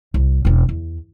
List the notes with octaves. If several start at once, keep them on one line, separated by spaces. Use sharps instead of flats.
C2
E1 C#4
E2